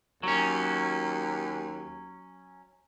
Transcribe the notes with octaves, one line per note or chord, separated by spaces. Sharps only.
D#2 F#3 C#4